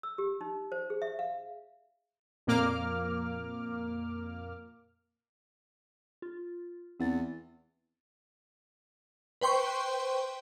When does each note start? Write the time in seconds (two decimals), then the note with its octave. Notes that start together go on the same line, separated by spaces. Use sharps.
0.03 E6
0.18 G4
0.41 D#4
0.72 C5
0.90 G#4
1.02 E5
1.19 F5
2.47 F2 A#2 A#3 D6 F6
6.22 F4
7.00 E2 C4 F#5 A6
9.41 B4 C5 G5 C6 C#6